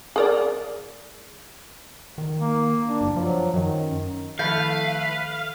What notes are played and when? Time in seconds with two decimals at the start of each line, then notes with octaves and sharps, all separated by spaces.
0.16 G#4 A#4 D5
2.18 D#3
2.40 A#3
2.87 D4
3.01 F#1
3.16 F3 F#3
3.54 F#2 D#3
4.39 D#3 F3 A3 E4 B4 F5